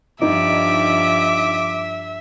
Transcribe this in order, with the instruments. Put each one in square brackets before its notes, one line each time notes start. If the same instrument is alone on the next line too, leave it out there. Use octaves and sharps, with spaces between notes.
[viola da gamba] G2 F3 [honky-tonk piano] D#4 [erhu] E5 [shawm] D6